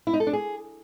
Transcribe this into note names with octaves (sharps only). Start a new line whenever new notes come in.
E4
D#4
A4
D4
G#4